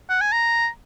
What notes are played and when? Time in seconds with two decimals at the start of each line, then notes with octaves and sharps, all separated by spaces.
0.09 F#5
0.21 G#5
0.32 A#5